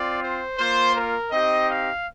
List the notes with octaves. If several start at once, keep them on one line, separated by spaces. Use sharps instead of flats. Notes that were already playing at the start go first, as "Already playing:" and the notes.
Already playing: C4 F4 D5
C5
A#3 F4 C5
A#4
C4 D#4 G4 D#5
F5